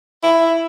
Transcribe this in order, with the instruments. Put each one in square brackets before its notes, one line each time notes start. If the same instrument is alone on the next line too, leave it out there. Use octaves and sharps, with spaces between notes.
[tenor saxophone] E4